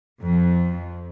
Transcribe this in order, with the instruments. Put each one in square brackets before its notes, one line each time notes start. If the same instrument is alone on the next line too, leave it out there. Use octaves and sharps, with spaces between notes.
[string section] F2